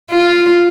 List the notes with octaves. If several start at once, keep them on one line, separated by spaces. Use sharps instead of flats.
F4